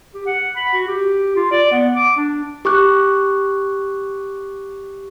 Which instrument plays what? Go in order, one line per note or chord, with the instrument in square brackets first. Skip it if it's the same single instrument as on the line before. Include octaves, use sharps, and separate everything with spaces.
[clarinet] G4
F#5
B5
F#4
G4
F4
D5
B3
D6
D4
[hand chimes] G4 C#6 D6 F#6